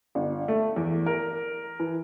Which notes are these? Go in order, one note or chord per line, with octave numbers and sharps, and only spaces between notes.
G1
A3
E2
A#4
E3